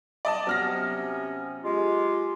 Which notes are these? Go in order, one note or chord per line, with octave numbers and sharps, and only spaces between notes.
D5 D#5 A5
C3 F#3 B3 C#4 F6 A#6
G#3 F4 G4